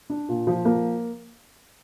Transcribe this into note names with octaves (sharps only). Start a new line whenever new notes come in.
D4
A#2
F3
A#3